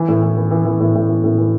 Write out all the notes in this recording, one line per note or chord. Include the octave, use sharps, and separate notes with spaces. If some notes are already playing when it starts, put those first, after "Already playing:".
Already playing: E3
A2
E3
E3
E3
E3
A2
A2
E3
A2
E3